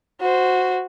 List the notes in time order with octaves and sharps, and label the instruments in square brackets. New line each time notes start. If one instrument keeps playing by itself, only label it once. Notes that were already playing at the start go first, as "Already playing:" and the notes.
[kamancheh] F#4 C5